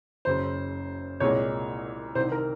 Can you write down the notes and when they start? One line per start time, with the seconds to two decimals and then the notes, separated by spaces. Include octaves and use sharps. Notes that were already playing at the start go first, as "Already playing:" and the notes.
0.25 F#1 F#2 C#3 C5
1.20 C2 A#2 G#3 C#5
2.15 C2 C5
2.18 C3 D#3
2.32 A#4